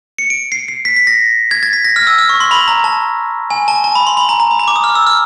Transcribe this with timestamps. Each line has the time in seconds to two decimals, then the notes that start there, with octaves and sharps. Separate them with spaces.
0.18 C#7
0.30 D7
0.52 C7
0.68 C7
0.85 B6
0.96 B6
1.07 A#6
1.51 G#6
1.63 A6
1.73 B6
1.85 A#6
1.96 F6
2.07 E6
2.18 F6
2.29 C#6
2.40 C6
2.51 B5
2.68 A#5
2.84 A5
3.50 G#5
3.68 A5
3.84 A5
3.95 B5
4.07 C6
4.17 B5
4.29 A#5
4.40 A#5
4.51 B5
4.59 A#5
4.68 D6
4.76 D#6
4.84 F6
4.95 E6
5.07 F6